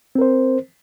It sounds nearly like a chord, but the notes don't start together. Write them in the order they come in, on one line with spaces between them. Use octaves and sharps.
C4 A#4 C5